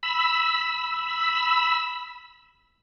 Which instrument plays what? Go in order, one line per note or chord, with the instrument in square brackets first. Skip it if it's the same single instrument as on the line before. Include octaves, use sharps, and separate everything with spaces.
[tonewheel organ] B5 E6